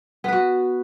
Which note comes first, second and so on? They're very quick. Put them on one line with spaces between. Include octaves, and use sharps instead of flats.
B3 B4 F#4